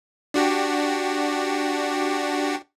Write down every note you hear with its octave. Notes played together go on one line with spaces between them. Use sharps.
D4 F#4 G4